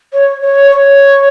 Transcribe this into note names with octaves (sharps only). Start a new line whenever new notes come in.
C#5
C#5
C#5